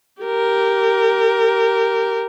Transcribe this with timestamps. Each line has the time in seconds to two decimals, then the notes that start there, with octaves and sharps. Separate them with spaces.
0.22 G4 A#4